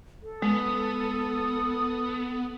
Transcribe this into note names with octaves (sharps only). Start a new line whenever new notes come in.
A4
G#3 B3 D#6